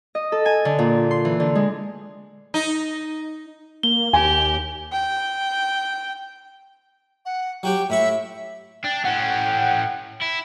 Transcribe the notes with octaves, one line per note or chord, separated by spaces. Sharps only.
D#5
A4
G#5
D3
A#2
C6
E3
D3
G#3
D#4
A#3 G7
D#2 G4 G#5
G5
F#5
F#3 F#4 G4 G5
A2 E4 E5 C#6
D4 G5
A2 C#4 F#5
E4